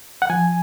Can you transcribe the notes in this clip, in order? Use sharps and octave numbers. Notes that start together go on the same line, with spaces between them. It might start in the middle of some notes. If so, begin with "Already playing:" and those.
F#5
F3 G#5